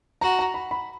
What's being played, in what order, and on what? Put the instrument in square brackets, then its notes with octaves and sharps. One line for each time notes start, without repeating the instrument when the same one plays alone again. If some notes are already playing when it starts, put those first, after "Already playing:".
[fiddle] F#4 [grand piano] A#5
[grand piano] A#5
B5
B5